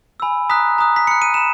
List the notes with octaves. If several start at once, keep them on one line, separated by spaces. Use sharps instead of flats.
G#5 B5 E6
A#5 D#6 F#6 B6
A#5 D#6 F#6
B6
B5 F#6 C#7
D#7
B5 E7